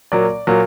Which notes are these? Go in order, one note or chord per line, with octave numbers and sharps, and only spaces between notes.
A#2 F#3 A#3 D5
A#2 F#3 A#3